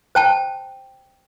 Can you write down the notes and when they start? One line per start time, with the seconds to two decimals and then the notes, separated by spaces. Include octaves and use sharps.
0.15 C5 G5 A5